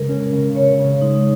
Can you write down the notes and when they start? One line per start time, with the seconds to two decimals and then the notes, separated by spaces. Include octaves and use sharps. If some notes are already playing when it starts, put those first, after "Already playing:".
Already playing: C#3 G#3 A#4
0.09 C#4
0.33 C#3
0.55 C#3 C#5
0.79 C#3
1.01 G#3 D#4